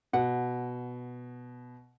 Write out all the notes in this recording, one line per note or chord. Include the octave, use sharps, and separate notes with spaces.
B2 F#5